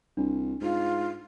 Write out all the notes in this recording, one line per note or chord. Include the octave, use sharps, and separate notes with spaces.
C2 D4
G#2 F4